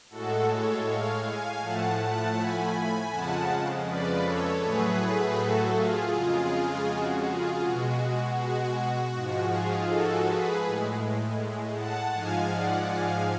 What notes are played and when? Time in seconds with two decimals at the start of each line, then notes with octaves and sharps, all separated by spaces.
0.10 A2 G#3 F#4 A4
0.48 A4 C#5
0.85 C#5 F5
1.23 F5 G#5
1.61 A2 F3 A3 F#5 A5
1.98 F#5 A5
2.36 G#5 B5
3.11 F2 C#3 F3 G#3 F#5 A5
3.86 B4 D5
4.24 A4 C#5
4.61 A2 F#3 A3 G#4 B4
5.36 F#4 A4
5.74 F4 G#4
6.12 F2 C#3 G#3
6.87 F#4
7.25 F4 G#4
7.62 B2 G#3 F#4
8.37 F#4
9.12 G#2 F3 G#3
9.50 F4 G#4
9.87 F#4 A4
10.25 G#4 B4
10.63 A2 G#3
11.76 F#5 A5
12.13 G#2 F3 G#3 F5 G#5
12.51 D5 F#5
12.88 F5 G#5